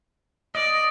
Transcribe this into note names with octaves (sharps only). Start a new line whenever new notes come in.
D5 D#5